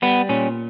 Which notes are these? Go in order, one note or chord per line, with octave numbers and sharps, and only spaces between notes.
G3 B3
A#2 C#4